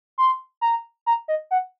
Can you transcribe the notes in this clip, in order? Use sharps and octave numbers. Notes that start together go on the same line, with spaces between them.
C6
A#5
A#5
D#5
F#5